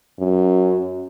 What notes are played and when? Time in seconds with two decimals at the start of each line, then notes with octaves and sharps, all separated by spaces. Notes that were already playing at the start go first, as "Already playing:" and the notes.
0.19 F#2